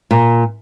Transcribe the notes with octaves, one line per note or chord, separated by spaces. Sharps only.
A#2